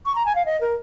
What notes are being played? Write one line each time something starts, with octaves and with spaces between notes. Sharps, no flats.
C#6
A#5
G#5
F5
D#5
A#4